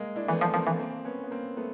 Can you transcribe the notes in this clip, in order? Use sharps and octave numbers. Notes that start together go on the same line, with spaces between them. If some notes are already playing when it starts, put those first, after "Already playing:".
Already playing: G#3 A#3
D4 E4
E3 A3 B3
F3
F3 A#3 C4
E3
A#3 C4
B3 C#4
B3
A#3 C4
A3 B3